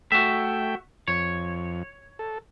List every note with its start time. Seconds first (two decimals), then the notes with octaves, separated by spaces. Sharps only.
0.12 A3 F#4 E5 G5
1.08 F2 C#5
2.19 A4